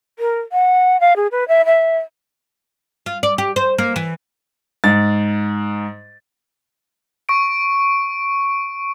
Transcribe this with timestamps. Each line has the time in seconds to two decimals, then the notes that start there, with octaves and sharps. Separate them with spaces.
0.19 A#4
0.52 F#5
1.01 F5
1.16 G#4
1.32 B4
1.48 E5
1.66 E5
3.06 F4
3.23 D5
3.38 G4
3.56 C5
3.78 A#3
3.96 E3
4.84 G#2 A6
7.29 C#6 D7